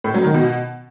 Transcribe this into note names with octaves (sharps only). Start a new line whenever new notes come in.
A2
F#3
D#3
B2